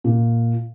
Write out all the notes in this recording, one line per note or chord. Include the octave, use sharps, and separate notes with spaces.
A#2